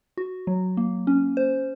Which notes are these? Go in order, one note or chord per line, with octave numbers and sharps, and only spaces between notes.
F#4
F#3
A#3
C#4
C5